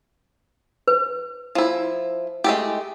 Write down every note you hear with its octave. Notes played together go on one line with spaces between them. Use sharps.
B4
F3 E4
G#3 A3 G4